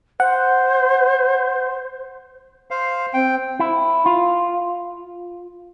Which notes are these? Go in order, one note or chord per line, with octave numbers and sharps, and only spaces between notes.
C5 F#5
C5 F5
C4 G5
E4
F4